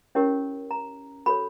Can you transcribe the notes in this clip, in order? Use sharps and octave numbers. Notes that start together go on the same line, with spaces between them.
C#4 E4 G4 A#4 C#5
A#5
F#4 A4 C#5 B5